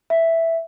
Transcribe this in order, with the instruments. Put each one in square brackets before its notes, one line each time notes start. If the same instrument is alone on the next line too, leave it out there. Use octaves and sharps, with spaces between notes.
[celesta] E5